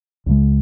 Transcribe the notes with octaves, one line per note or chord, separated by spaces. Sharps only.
C#2 C#3 G#3